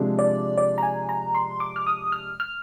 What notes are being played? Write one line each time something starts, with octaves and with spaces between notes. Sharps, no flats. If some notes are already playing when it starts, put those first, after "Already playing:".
Already playing: C3 F3 G#3 D4
D5
D5
A#5
G#5
A#5
C6
D6
F6
D#6
F6
F6